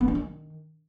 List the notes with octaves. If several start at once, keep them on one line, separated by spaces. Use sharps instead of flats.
B3
D4
D#3